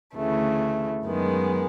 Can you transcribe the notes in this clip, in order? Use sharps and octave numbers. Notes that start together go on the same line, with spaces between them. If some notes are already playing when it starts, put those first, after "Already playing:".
D2 C#3 E3 A3
F#2 D#3 G#3 B3